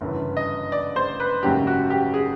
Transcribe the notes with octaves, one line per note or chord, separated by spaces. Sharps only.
G1 F#2 C#3 E3
D#5
D5
C5
B4
G#1 F#2 C#3 F#3 A#3 G4
F#4
G4
G#4